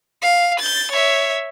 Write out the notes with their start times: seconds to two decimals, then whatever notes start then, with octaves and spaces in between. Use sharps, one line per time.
0.22 F5
0.59 G6 A6
0.91 C#5 E5